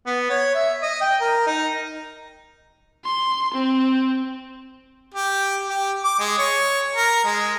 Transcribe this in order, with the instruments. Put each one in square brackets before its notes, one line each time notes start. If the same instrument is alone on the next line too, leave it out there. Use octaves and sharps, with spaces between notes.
[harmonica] B3
C#5
E5
D#5
G5
A#4
D#4
[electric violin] C6
C4
[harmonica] G4
G4
D6
G#3
C#5
A#4
G#3